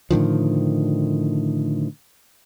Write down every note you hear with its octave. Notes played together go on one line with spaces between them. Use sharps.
A2 D3 D#3 F3